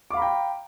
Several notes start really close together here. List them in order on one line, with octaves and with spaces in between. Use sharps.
D6 F5 B5 A#5 G5